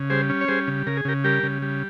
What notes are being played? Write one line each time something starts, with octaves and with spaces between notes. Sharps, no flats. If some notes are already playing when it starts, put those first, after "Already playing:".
Already playing: C#3
G3 G#4 C5
C#4
C#5
G3 G#4 C5
C#3
C#3 A#4
G#4
C#3 G4 A#4
G3 G4 A#4
C#3
G3